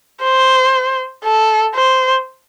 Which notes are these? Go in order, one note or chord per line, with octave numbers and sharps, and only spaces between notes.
C5
A4
C5